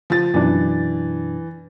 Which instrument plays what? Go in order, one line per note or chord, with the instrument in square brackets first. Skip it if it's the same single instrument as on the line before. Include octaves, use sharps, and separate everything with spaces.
[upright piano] F3 A6
[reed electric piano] F#2 B2 D4 [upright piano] E3